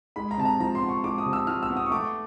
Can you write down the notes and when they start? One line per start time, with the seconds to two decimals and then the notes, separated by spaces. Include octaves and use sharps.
0.16 G#3 B5
0.31 A#5
0.38 C3 A5
0.45 A#5
0.60 F3 A#5
0.75 C6
0.81 B3
0.89 C#6
1.03 G#3 D6
1.18 D#6
1.25 C3
1.33 E6
1.47 F3 F6
1.63 E6
1.70 B3
1.77 D#6
1.86 C#6
1.91 A3 D6